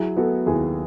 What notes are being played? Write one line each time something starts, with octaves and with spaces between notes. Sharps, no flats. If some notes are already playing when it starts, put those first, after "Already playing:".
Already playing: F#3 E4 G#4
B3 F#4 A4
D#2 E4 G#4